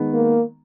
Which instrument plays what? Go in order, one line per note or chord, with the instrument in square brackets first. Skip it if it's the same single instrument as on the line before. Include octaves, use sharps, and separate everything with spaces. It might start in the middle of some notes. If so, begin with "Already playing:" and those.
Already playing: [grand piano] D#3 G#3 B3
[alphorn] A#3